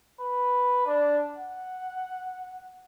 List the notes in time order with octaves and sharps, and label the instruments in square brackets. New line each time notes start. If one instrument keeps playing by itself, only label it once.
[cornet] B4
D4
F#5